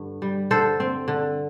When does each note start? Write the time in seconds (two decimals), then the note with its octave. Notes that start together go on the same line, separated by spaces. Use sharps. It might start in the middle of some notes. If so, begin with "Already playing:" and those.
Already playing: G2 D3
0.22 G3
0.51 D3 A4 C5
0.80 C4
1.08 D3